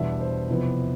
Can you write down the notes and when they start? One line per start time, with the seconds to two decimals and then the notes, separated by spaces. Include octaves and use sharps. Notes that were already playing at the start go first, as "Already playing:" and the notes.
Already playing: E2 B2 G3 B3 D4 E5
0.20 C5
0.49 F2 C3 E3 B3